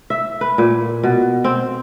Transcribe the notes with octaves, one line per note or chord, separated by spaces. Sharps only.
E5
B4
A#2
B2
C4